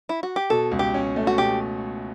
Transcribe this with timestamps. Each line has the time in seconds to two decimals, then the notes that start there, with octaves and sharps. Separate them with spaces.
0.09 E4
0.23 F#4
0.36 G4
0.50 B2 A4
0.71 C#2
0.79 G4
0.94 C#4
1.16 A3
1.27 F#4
1.38 B2 G4